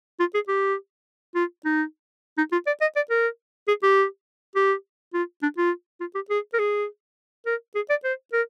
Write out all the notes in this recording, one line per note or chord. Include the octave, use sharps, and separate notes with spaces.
F4
G#4
G4
F4
D#4
D#4
F4
D5
D#5
D5
A#4
G#4
G4
G4
F4
D4
F4
F4
G4
G#4
A#4
G#4
A#4
G#4
D5
C5
A#4